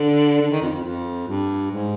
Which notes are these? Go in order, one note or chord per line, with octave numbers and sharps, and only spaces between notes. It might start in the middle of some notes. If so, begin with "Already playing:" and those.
Already playing: D3
D3
D#3
F2
F2
F2
G2
G#2